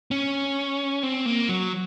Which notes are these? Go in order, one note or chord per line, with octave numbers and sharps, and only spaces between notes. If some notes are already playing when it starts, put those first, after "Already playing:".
C#4
C4
A#3
F#3